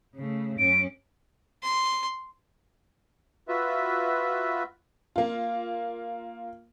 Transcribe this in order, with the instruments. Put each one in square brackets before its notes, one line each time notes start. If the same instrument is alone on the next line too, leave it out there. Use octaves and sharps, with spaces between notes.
[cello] C#3 A3
[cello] F#2 C#4 [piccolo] D7
[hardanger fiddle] C6
[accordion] F4 F#4 B4 E5
[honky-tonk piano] A#3 F4